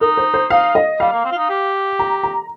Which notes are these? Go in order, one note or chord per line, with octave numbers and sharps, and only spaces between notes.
D#4 A#4
C5
C5
D#4 F5
D#5
G3 F5
A#3
C4
F4
D#4
G4
A#5
A#5